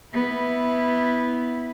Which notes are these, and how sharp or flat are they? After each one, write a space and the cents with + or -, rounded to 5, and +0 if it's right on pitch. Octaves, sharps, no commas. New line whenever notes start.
B3 +0 E4 -10